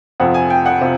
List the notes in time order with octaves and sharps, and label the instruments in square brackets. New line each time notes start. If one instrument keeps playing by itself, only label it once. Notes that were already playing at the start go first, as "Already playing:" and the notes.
[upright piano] F2 C3 F3 F#5
G#5
G5
F#5
C3 F3